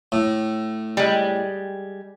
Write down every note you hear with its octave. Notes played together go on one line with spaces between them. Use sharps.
A2
G3 G#3